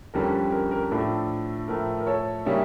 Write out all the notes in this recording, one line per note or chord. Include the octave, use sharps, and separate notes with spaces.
F2 D3 G3 C#4 A#4
A#4
A#4
A2 F3 A3 D4 A4
A2 F3 A3 A#4
A#4
A4 C#5
C#3 G3 A#3 C#4 C#5 E5